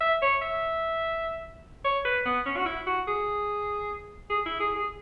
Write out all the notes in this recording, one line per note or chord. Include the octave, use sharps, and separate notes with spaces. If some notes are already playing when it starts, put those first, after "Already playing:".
E5
C#5
E5
C#5
B4
B3
C#4
F#4
E4
F#4
G#4
G#4
E4
G#4
G#4